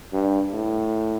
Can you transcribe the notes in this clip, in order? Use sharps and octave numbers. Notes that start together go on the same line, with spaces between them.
G2
A2